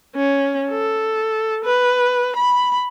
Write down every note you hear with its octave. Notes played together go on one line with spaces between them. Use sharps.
C#4
A4
B4
B5